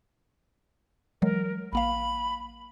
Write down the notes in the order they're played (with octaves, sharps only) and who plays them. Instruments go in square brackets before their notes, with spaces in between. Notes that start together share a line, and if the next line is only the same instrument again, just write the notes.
[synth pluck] E3 F#3 G#3 [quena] A#4
[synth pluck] A1 A#3 F5 [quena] B5